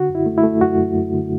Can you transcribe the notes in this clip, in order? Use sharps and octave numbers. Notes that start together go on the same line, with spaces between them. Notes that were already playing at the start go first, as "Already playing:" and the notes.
Already playing: D3 F#4
F#2
E4
A3
E4
A3
F#2 F#4
F#2
F#2
D3